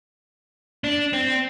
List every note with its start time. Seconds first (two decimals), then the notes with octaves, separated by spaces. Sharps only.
0.84 D4
1.13 C4